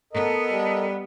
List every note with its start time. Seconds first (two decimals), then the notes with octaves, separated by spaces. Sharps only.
0.13 B3 A4 A#4 D#5
0.52 G3